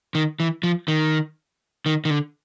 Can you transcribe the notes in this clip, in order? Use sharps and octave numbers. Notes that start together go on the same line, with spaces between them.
D#3
E3
F3
D#3
D#3
D#3
D3